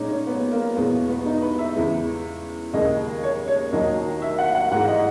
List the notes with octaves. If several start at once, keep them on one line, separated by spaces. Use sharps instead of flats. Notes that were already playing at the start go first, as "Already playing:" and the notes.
Already playing: A#2 G#3 C#4 D#4
C#4
B3
A#3
E2 B2 G#3 B3
B3
D#4
B4
E5
E2 C#3 E3 G#3
D#2 C#3 G#3 D#5
C#5
C#5
D#2 D#3 F#3 D#5
E5
F#5
F#5
G#2 E3 G#3 F#5
D#5